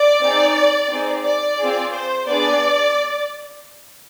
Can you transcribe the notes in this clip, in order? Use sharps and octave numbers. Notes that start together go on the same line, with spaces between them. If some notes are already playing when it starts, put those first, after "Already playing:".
Already playing: D5
C4 D#4 G#4
C4 D#4 G#4
D5
C4 F4 G#4
C5
B3 D4 G#4 D5